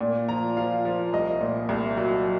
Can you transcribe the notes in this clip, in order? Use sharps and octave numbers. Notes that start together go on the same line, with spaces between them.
A#2
F3 A#5
F3 F5
F3
C2 D#5
A#2
C2
F#3